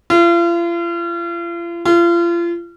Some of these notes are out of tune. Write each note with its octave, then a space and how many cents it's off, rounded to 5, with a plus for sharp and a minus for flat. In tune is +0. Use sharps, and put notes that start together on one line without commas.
F4 -40
F4 -35